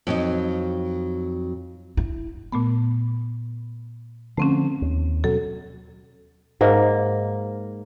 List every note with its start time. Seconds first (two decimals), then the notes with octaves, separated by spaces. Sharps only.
0.07 F2 F#3 D#4
1.97 E4
2.52 A#2 A3 B3
4.37 D3 F3 A3 C4 C#4
4.82 D#2
5.24 B2 F#3 C#4 A4
6.61 G#2 A#3